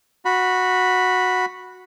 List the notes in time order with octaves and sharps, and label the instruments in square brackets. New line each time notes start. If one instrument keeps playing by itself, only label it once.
[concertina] F#4 B5